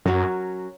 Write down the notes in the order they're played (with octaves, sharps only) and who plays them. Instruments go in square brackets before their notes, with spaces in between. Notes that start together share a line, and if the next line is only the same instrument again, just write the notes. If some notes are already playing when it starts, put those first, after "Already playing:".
[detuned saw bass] F#2 [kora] F#3 C#4 F#4 A#4